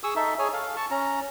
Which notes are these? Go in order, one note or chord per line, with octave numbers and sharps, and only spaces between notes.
G#4 C#6 D#6 E6
D#4 A4 E5
G#4 C#5 G#5
A4 F5
A5 C#6
C#4 A#5